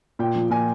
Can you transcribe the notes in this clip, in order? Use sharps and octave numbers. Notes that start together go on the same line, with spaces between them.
A#2 G5
F3
A#2 G#5